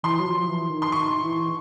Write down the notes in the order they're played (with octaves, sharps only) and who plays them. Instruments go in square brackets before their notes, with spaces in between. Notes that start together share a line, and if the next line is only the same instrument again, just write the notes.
[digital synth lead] E3 [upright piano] C6
[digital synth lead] F#3
F3
E3
D#3
[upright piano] C6
[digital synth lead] D#3 [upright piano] C#6
[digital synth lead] E3